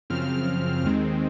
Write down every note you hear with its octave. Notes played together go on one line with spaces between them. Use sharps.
F#2 C#3 F3 C4 F6
D#2 D#3 G#3 C4